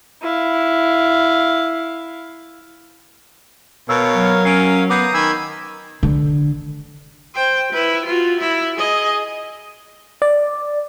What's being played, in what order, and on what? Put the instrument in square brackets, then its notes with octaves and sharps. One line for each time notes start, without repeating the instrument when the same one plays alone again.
[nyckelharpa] E4 F5
[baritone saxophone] B2 [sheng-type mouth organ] A#4 C#5 F5 [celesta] E6
[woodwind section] F#3
[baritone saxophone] C#4 [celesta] C7 D7
[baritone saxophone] B3 [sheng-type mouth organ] A#5 D#6 [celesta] D6 G6 C7
[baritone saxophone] D#3 [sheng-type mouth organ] G#5 B5 E6
[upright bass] D3
[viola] C5 G5
E4 B4
F4 F#4
E4
G#4 D#5
[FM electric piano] D5